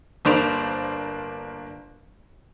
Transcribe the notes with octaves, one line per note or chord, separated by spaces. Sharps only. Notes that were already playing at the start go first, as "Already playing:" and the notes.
G1 A#3 D4 C5 D7 F7